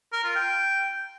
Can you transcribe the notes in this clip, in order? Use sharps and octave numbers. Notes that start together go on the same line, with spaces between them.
A#4
F4
G5